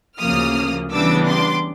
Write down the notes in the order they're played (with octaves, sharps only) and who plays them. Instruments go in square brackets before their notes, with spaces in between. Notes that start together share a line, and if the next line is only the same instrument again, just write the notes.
[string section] D2 C#3 F3 A#3 D#6 F6
C#3 E3 G3 B3 D4 D6 E6
C6 D6